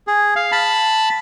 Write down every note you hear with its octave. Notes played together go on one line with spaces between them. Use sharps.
G#4
F5
A5 B5